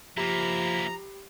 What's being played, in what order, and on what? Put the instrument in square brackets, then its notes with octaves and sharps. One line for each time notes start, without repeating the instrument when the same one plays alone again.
[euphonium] F3 [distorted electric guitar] A#3 E4 [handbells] G4 B5 C7 [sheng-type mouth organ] A#5